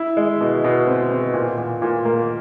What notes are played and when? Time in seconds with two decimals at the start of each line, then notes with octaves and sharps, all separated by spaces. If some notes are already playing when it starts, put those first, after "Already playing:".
Already playing: E4
0.17 G#3
0.41 B2
0.64 B2
0.87 C4
1.10 C4
1.34 A#2
1.58 A#2
1.82 A#2
2.05 A#3